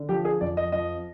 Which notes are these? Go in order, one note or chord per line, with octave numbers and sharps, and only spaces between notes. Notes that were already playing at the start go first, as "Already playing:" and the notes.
Already playing: D3
F3 G4
G#4
F2 D5
D#5
F3 D#5